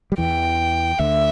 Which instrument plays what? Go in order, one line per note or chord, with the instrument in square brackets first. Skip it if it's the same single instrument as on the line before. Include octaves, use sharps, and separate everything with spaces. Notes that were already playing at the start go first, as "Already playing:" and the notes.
[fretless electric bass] G3
[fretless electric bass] E2 E3 [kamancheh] G5
[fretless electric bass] D2 D3 [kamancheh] E5